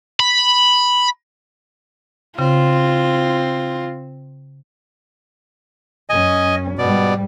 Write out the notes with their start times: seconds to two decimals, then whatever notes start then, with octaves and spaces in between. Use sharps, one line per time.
0.20 B5
2.39 C#3 C4 F4
6.10 F#2 C#4 D#5 G#5
6.78 G#2 B2 G3 D5